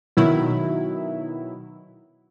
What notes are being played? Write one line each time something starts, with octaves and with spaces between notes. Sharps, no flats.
B2 D#3 F#3 E4